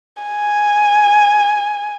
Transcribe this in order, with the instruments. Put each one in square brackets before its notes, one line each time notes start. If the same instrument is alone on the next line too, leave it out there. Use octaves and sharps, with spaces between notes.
[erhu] G#5